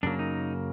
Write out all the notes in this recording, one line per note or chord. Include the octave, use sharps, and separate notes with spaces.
F#2 C#3 F#3 A#3 D4
D#4